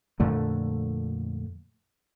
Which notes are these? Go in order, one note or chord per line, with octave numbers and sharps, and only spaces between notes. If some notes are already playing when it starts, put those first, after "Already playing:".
F2 A#2 D3 A3